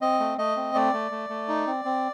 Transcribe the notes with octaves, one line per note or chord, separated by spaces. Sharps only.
C4 D#5
A3
A3 D#5
C4
A3 D5
A3
A3
A3
D#4
C4
C4